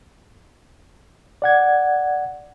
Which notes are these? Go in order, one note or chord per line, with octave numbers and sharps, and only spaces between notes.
D5 F#5 G#6